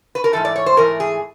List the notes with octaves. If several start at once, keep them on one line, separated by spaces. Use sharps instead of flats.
B4
A#4
G#2 E3 A3 A4
D5
C#5
C5
G#2 E3 A3 A#4
G#4